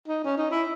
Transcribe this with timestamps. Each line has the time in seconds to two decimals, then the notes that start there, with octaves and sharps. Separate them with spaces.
0.08 D#4
0.24 C#4
0.38 D#4
0.51 E4